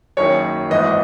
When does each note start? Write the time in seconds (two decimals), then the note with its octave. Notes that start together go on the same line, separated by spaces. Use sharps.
0.17 F#1 F#2 D#3 C#5
0.70 G#1 G#2 E3 D#5